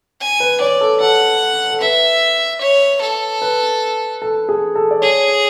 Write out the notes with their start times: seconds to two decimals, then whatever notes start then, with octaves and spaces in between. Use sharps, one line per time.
0.20 G#5
0.40 B4
0.60 C#5 D5
0.81 A4
1.01 A4 F#5
1.71 A4
1.81 B4 E5
2.61 C#5
3.01 A4
3.42 B4
4.22 A4
4.49 G#4
4.75 A4
4.91 D5
5.01 G#4 C#5